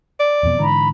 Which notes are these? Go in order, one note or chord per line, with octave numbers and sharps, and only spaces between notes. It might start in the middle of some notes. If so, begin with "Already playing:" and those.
D5
E1 F2 B2
G#2 D3 E3 A#5 B5